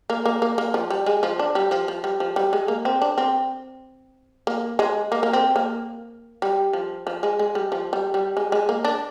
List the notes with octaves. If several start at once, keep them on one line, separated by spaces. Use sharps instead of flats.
A#3
A#3
A#3
A#3
F3
G3
G#3
F3
D4
G3
F3
F3
G3
F3
G3
G#3
A#3
C4
D4
C4
A#3
G#3
A#3
A#3
C4
A#3
G3
F3
F3
G#3
G#3
G3
F3
G3
G3
G#3
G#3
A#3
D4